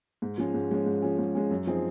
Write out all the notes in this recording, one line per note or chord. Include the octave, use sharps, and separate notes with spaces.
G#2
F3 G#3 C#4
G#2
F3 G#3 C#4
G#2
F3 G#3 C#4
G#2
F3 G#3 C#4
F#2
F3 C4 D#4 G#4